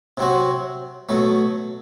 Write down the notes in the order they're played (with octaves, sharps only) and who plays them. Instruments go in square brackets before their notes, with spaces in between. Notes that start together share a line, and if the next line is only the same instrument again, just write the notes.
[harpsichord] C3 F#3 C4 F#4
B2 F#3 A3